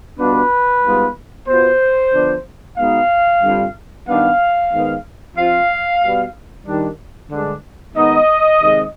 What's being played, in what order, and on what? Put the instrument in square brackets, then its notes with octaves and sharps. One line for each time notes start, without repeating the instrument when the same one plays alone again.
[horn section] B2 G3 B3 D4 F4 B4
G#2 G3 B3 F4
B2 B3 F4 C5
D3 F3 B3 D4
B2 G#3 B3 D#4 F5
G2 D3 G3 C4 F4
G2 D#3 B3 D4 F5
G#2 D#3 B3
F3 C4 F4 F5
B2 G3 B3
D#3 G3 D4
G2 D3 G#3 D4
G#2 D#3 B3 D#4 D#5
C3 D#3 G#3 C4